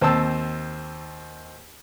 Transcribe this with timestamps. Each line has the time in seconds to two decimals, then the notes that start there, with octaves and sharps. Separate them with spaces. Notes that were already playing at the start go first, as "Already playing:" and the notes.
0.01 D#2 C4 C5 A5 E6